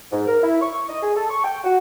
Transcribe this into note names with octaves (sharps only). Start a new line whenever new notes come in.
G#2
A#4
E4
C#6
D#5
G#4
A4
C#6
G5
F#4